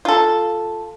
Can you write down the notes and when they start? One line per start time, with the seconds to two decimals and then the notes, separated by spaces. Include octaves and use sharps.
0.05 F4 A4